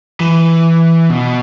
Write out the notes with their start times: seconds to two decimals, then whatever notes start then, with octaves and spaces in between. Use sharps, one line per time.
0.20 E3
1.10 B2